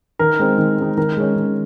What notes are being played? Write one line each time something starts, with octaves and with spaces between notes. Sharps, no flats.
D#3 A#4
G#3 C4 D#4
D#3
G#3 C4 D#4
D#3 A#4
G#3 C#4
D#3